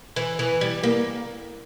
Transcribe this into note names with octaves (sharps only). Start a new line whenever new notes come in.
E3
E3
G3
A#3